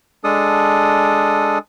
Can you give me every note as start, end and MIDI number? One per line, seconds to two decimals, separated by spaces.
0.24 1.58 56
0.24 1.58 62
0.24 1.58 69
0.24 1.58 87